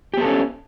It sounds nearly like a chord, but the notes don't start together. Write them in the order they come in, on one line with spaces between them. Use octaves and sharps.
G4 B3 A4 C#4